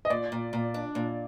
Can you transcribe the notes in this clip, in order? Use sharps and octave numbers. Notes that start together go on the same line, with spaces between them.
D#5
A#2 D5
A#2
A#2
D4
A#2